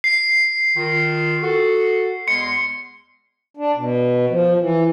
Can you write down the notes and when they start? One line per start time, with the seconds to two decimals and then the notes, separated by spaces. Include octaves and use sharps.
0.04 C7
0.77 D#3 F4
1.42 F#4 A4
2.28 E2 G#3 C6 C#7
3.57 D4
3.76 B2
4.30 F3
4.59 E3